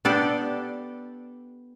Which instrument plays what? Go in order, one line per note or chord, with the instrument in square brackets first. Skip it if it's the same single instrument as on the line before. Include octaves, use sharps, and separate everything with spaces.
[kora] B3 G4 [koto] D4 A4 D5